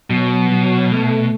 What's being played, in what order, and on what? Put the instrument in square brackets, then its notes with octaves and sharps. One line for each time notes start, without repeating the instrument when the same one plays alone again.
[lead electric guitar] B2 [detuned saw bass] F#3
[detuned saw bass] F#3
A3